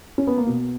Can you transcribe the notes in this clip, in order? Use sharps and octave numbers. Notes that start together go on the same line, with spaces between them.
C#4
B3
A#3
B2